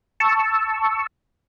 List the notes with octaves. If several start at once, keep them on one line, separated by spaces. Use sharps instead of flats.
A5 C#6 E6